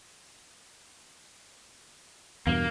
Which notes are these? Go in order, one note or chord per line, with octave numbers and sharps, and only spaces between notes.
E2 G2 B2 A#3